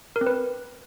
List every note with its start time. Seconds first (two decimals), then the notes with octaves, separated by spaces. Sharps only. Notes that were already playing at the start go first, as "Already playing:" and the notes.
0.16 A#4
0.21 C4
0.26 B4